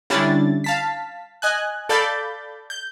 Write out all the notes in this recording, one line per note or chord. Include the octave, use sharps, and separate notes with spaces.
D3 G3 C#4 D4 E4 A6
F5 A5 B6
D#5 G#5 F#6
A4 D5 F5 B5 G6 A6
G6